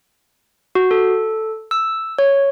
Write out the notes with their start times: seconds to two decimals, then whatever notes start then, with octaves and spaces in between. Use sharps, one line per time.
0.75 F#4
0.91 A4
1.71 E6
2.19 C#5